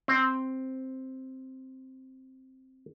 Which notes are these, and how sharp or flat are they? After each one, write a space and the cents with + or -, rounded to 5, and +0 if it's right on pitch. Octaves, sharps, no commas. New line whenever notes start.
C4 +0